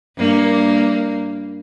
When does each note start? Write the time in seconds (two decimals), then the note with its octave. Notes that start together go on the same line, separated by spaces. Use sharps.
0.18 G2 A#3